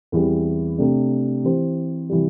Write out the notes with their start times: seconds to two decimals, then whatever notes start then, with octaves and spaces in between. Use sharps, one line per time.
0.12 E2 E3 G3 C4
0.78 C3 A3 D4
1.44 E3 C4 G4 C5
2.09 C3 E3 G3